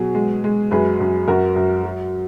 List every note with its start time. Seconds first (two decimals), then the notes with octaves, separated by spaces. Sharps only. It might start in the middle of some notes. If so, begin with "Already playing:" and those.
Already playing: B2 F#3 G#4
0.15 G#3
0.44 G#3
0.71 F#2 G#4 B4
1.00 F#2
1.27 F#2 F#4 A#4
1.56 F#2
1.84 F#3